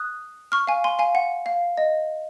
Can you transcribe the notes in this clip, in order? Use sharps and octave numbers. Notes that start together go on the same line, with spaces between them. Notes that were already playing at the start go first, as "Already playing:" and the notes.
Already playing: D#6 F#6
C#6 F6
F5 G#5
G#5 C6
F5 G#5
F#5
F5
D#5